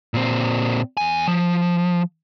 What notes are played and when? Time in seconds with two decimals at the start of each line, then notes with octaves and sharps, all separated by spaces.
0.14 A#2 C4
0.97 E2 G#5
1.28 F3